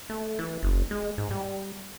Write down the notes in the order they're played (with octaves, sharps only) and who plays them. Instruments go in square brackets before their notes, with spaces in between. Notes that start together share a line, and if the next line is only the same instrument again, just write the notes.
[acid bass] A3
E3
F#1
G#3
G#2
G3